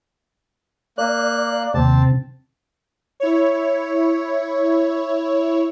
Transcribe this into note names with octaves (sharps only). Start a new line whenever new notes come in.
A#3 D5 F#6
D#2 C3 C4 A5
E4 C#5